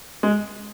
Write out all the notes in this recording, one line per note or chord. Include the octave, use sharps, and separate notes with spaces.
G#3